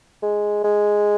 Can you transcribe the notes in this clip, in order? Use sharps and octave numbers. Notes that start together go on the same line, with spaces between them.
G#3
G#3